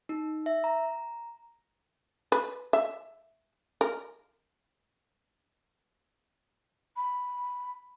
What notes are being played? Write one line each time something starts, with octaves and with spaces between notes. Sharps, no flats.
D#4
E5
A#5
B4
E5
A#4
B5